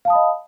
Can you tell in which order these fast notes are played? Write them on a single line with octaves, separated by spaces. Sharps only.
F5 A5 D#6 B5 D#5